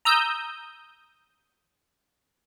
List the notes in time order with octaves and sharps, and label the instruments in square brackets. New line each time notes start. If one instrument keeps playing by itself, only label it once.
[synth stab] A#5 D#6 E6 G6